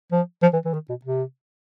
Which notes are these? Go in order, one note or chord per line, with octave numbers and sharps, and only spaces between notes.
F3
F3
E3
E3
D#3
B2
C3